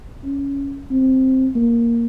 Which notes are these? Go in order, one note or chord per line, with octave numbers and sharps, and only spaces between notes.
C#4
C4
A#3